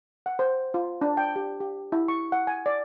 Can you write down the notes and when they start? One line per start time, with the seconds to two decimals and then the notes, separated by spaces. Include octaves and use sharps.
0.26 F#5
0.39 C5
0.74 F4
1.01 D4
1.17 G5
1.36 G4
1.60 G4
1.92 E4
2.08 C#6
2.32 F#5
2.47 G#5
2.66 D5